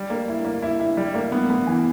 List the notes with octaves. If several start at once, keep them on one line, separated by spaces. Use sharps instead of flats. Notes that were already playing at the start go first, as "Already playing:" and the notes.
Already playing: G3
A#3
E4
A#3
E4
E4
G3
A#3
B3
B3
E3